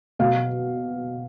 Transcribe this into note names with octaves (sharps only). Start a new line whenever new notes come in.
B2 F5